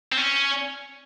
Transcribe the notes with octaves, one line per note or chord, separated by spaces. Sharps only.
C4
C#4